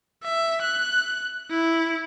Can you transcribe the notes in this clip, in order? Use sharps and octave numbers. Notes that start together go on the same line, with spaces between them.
E5
F#6
E4